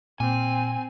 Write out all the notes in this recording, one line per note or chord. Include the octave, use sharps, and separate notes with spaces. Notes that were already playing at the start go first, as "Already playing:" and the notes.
A#2 C4 G#5